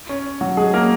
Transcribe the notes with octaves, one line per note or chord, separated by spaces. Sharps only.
C#4
F#3 F#4
G#3 G#4
A#3 A#4